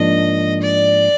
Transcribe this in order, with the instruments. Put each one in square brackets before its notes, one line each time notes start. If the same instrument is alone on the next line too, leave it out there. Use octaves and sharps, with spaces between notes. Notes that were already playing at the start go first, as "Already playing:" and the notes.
Already playing: [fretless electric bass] G#2 F3 A#3 D4 [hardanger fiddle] D#5
[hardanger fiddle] D5